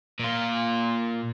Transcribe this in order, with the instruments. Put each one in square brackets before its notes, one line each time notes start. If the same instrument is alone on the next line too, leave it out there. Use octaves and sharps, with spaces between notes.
[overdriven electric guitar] A#2 F4